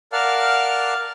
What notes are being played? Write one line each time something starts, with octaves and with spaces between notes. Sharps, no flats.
A#4 D5 F5 F#5 A5 F6